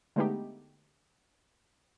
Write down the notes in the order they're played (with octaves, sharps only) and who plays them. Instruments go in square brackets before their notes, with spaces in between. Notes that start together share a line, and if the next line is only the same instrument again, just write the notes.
[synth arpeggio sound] D3 G#3 A3 B3 D#4 G4